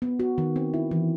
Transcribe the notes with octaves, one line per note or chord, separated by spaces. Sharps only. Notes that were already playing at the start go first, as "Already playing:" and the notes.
B3
F#4
D#3
C4
E4
E3